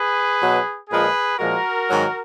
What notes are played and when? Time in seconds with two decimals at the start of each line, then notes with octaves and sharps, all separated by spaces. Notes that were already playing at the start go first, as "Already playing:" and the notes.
Already playing: G#4 B4
0.41 B2 F#3
0.89 A#2 F3 G#3 G#4 B4
1.38 A#2 F3 G#3 F#4 A#4
1.88 G#2 D#3 F#3